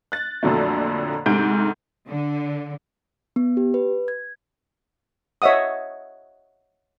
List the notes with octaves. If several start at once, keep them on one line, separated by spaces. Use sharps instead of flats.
F#6 A6
F2 A#2 D3 F#3 A3
D2 G#2 C3 F#5 G6 D7
D3
B3
G4
B4
G#6
C#5 D#5 E5 F#5 D#6